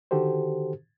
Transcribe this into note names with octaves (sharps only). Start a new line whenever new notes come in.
D3 D#3 F#4 G4 A4 C5